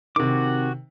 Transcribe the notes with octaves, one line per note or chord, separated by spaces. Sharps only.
C3 D#3 F#4 D6